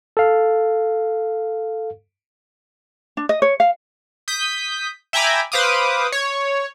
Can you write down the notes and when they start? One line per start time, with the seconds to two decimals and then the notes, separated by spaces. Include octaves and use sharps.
0.17 A4 F5
3.17 D4
3.29 D#5
3.42 C#5
3.60 F5
4.28 D#6 G6 B6
5.13 E5 G5 G#5 A#5 B5 D6
5.52 B4 C5 F5 D6 D#6
6.12 C#5